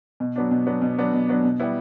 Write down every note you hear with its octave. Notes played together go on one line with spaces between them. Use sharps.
B2
F#3 B3 D4
B2
F#3 B3 D4
B2
F#3 B3 D4
B2
F#3 B3 D4
B2
G3 B3 E4